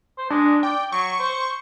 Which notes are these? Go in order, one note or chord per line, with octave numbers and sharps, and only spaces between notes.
C5
G#3 D4
D5 G5
F#3 C#6
C5